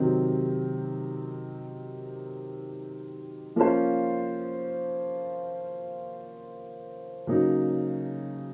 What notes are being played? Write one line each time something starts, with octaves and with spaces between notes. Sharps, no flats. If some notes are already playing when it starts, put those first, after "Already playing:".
Already playing: C3 D#3 F#3 C4
F3 A#3 C#4 F4 C5
C#3 F#3 A#3 D#4